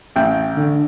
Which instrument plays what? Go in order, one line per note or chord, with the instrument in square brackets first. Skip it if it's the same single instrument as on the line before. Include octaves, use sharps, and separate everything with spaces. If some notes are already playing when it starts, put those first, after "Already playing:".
[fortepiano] A1 G5
[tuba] D3